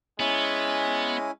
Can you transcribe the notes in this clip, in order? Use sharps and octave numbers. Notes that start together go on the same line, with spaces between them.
G#3 B3 C#4 E4 G#5